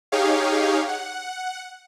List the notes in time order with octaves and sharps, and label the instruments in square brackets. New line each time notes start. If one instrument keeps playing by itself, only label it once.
[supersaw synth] D#4 G4 G#4 C#5 F5
F#5